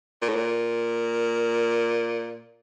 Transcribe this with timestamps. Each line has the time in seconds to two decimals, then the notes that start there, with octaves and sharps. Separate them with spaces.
0.22 A#2
0.29 A2
0.35 A#2